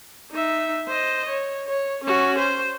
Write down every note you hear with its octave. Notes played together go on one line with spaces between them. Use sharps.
D#4 E5
C5 D#5
C#5
C#5
C#4 F#4
C5